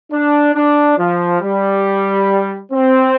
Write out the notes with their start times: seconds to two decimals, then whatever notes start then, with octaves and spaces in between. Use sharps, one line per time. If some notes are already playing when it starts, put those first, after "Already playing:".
0.11 D4
0.54 D4
0.98 F3
1.41 G3
2.72 C4